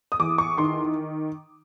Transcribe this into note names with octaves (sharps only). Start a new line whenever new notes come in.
D#6
E2 D6
C#6
D#3 C6